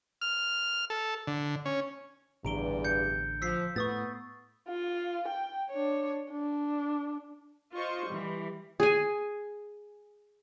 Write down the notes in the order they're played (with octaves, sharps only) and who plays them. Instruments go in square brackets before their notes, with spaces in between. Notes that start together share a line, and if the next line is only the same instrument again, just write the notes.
[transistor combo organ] F6
A4
D3
C#4
[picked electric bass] A1 D3 [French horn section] E2 G2 [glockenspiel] A#5 D7 G7
[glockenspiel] G6 C#7
[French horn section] F3 [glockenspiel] E6 B6 C7
[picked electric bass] A2 [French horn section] B3 [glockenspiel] C#6 D#6 A6
[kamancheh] F4
G5
D4 C#5
D4
[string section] F4 C5 D#5 C#6
E3 G3
[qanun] G#4 G#5